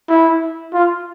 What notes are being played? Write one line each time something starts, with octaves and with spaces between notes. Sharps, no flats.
E4
F4